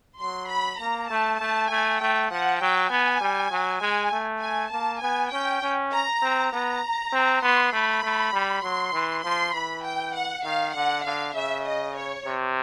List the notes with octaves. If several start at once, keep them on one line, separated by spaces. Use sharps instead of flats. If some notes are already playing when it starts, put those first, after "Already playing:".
F#3 C6
B5
A#3 A#5
A3 A5
A3 A5
A3 G#5
A3 G5
F3 F#5
F#3 G5
B3 G#5
G3
F#3
G#3 G#5
A3
G#5
A#3 A5
B3 G#5
C#4 G5
C#4
A#5
C4
B3 A#5
C4
B3 C6
A3 B5
A3
G3
F#3 C6
E3
F3 C6
E3 B5
G5
F#5
D#3 F5
D3 F#5
D3 F5
C#3 E5
D#5
C#5
C3